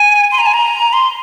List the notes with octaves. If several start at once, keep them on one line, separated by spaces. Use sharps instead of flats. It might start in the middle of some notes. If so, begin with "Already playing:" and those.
Already playing: G#5
C6
A#5
G#5
A#5
C6